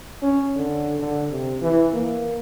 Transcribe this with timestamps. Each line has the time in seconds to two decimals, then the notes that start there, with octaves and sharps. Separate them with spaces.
0.22 C#4
0.56 D3
0.99 D3
1.31 C3
1.62 E3
1.93 A#3